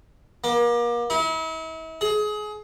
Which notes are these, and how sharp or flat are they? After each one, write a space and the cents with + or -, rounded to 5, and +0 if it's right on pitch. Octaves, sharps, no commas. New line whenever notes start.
A#3 +35
E4 -40
G#4 +25